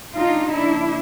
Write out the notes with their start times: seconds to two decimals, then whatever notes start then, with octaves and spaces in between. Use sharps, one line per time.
0.14 C#3 F3 A#3 D4 D#4 F4
0.52 D4 E4